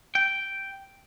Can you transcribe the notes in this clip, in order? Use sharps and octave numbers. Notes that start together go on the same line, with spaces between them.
G5